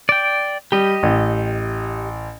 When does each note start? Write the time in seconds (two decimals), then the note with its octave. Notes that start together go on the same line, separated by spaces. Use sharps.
0.09 D5 G5
0.72 G3 G4 D#5
1.03 A1